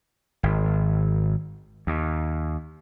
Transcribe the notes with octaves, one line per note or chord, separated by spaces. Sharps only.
G#1
D#2